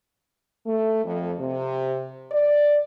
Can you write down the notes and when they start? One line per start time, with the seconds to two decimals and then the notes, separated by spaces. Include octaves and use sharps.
0.66 A3
1.05 F2
1.39 C3
2.31 D5